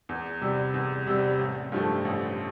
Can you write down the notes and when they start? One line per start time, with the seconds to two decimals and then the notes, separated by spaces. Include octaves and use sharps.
0.09 E2
0.41 C3 G3
0.74 E2
1.07 C3 G3
1.39 A1
1.72 G2 F3 A3
2.05 A1